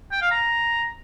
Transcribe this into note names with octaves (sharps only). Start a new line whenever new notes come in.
G5
F5
A#5